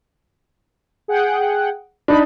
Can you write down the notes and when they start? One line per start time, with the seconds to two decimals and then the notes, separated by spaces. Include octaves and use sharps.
1.08 G#4 F#5 G5
2.08 D4 D#4 B5